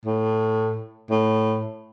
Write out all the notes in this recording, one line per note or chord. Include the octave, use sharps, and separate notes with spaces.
A2
A2